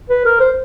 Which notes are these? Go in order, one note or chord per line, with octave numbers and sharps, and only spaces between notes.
B4
A#4
C5